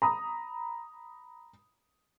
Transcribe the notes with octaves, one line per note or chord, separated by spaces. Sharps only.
A#5 B5 D#6